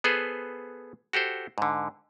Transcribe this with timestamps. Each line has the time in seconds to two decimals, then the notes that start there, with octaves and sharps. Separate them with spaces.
0.04 B3 G#4 A4 B4 C5
1.13 F#4 G4 A4 C5
1.58 G#2 D3